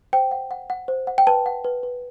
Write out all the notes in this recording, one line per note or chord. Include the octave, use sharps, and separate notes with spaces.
C5 G5
F#5
F#5
F#5
C5
F#5
G5
B4 A5
F#5
B4
B4